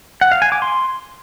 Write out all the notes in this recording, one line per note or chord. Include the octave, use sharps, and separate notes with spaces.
F#5
F5
G#5
D6
C6